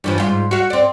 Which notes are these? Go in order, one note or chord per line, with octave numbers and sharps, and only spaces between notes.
G2 E3 F3
G#2 F4
F#4 F5
C4 D5